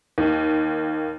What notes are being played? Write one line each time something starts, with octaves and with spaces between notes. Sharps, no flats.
D#2